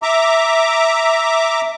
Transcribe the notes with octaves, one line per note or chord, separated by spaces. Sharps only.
E5 A#5 D6